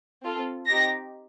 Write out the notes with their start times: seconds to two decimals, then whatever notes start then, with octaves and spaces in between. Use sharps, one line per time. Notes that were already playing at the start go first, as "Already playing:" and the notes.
0.22 C4 F4 A4
0.67 C4 D#4 G4 A#6